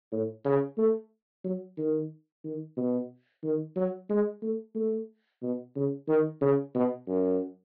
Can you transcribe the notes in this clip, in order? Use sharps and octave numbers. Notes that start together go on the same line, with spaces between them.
A2
C#3
A3
F#3
D#3
D#3
B2
D#3
F#3
G#3
A3
A3
B2
C#3
D#3
C#3
B2
F#2